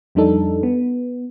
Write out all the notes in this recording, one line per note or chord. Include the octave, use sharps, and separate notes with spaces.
F2 G3 D4 D#4 A4
B3